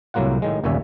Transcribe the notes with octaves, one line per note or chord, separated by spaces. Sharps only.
C2 A2 F#3 A#3 F4 F#5
A2 D#3 G#3
G1 D#2 A#2 C#3 C#4 E5